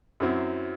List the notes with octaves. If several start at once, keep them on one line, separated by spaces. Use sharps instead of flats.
F#2 F#3 C4 E4